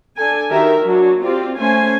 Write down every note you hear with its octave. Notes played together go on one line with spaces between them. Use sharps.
D4 A4 G#5
D#3 F#4 G4 A#4 E5
F#3 D4 F#4
C4 F4 G4 D5
A3 C#4 C5 G#5